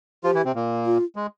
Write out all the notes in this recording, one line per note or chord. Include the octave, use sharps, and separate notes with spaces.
F3 F4 G4
E3 E4
C3 C4
A#2 A#3
F4
G#3